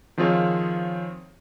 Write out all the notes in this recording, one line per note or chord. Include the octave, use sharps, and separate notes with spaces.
D#3 F3 C4 F4 G#4 C#5